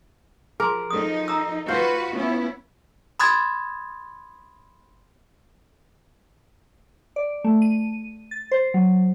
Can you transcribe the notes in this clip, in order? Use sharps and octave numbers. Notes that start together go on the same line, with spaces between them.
F3 G#4 A#4 C6
F3 D#4 A4 D#6
A#5 D#6 E6
F4 F#4 B4 C5
B3 C#4 E4
B5 C6 D#6 F#6 G#6 A6
D5
A3
D#7
A6
C5
F#3